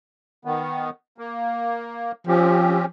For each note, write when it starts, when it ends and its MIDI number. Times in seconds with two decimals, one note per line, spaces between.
0.45 0.90 51
0.45 0.90 59
1.18 2.12 58
2.27 2.86 53
2.27 2.85 60
2.27 2.85 61
2.27 2.85 67